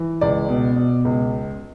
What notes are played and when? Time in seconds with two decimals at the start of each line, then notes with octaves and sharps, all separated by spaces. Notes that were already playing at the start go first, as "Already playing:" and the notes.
Already playing: E3
0.21 C#2 D5
0.49 B2
0.76 B2
1.05 C#2